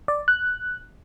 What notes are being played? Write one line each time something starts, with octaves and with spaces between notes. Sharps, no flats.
D5
F#6